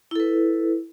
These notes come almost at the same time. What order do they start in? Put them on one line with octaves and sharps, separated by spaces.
E4 A4 B4